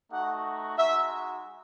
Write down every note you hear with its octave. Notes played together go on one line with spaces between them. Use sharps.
A3 D#4 F#4 F#5
G#3 D#4 F#4 E5